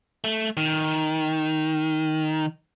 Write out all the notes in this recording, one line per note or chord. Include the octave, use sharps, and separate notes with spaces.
A3
D#3